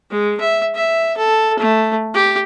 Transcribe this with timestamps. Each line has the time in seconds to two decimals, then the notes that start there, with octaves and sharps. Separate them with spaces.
0.11 G#3
0.40 E5
0.75 E5
1.17 A4
1.59 A3
2.14 G4